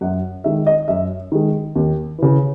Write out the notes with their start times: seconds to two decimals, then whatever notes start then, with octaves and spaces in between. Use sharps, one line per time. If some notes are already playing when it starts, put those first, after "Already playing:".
0.01 F#2 F#5
0.44 D#3 G#3 E5
0.67 D#5
0.88 F#2 E5
1.32 D#3 G#3
1.76 D#2
2.18 C#3 E3